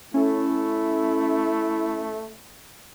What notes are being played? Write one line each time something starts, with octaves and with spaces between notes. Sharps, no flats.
A3 C#4 E4 A4